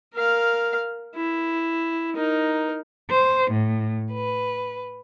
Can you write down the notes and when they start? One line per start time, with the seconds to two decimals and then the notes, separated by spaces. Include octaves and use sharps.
0.15 A#4 F5
1.16 E4
2.15 D#4 A#4
3.10 C5
3.51 A2
4.12 B4